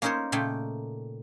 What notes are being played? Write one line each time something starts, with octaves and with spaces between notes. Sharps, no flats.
A#3 C#4 D#4 A#4 C5 C#5
A#2 C#3 A3 G5